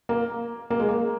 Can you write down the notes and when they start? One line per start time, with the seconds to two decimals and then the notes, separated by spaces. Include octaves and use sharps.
0.09 A#3
0.70 A#3
0.80 G#3
0.89 A#3